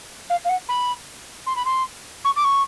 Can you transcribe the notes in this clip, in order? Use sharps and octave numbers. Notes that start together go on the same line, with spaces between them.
F5
F5
F#5
B5
C6
B5
C6
C#6
D6
C#6